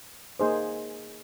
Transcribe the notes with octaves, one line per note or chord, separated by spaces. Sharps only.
A#3 D#4 G#4 C5